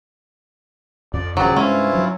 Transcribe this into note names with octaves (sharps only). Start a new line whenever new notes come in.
F2 D5
D#1 G#2 C#3 F3 F#3 G4 G#4 D5
G2 C3 G#3 C#4 E4 F4 C#5
F#3